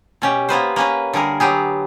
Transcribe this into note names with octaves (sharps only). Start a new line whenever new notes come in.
B2 C#4 G4
A#3 B3 B4 C5
A#3 C#4 B4
D3 G3 G#4 A#4
F#3 B3 G4 G#4